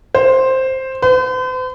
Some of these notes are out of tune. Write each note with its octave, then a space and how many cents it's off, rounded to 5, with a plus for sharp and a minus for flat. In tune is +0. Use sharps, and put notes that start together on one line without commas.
C5 +5
C5 -45